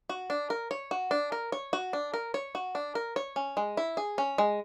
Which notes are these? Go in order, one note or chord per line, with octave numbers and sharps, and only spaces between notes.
F#4
D4
A#4
C#5
F#4
D4
A#4
C#5
F#4
D4
A#4
C#5
F#4
D4
A#4
C#5
C#4
G#3
E4
G#4
C#4
G#3